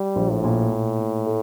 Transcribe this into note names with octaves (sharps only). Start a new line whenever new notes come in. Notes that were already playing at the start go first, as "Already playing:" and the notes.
Already playing: G3
A#1
A2
A#2
A#2
A#2
A3